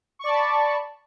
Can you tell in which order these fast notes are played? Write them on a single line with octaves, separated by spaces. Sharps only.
C#6 D5 A5 B5